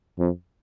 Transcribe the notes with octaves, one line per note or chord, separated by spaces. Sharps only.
F2